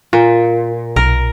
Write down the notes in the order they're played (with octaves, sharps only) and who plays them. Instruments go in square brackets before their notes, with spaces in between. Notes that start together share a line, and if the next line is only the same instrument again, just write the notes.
[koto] A#2 [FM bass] F4
[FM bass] B1 [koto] A#4